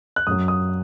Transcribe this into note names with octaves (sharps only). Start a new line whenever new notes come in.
F#6
F#2 F#3 D#6
D#6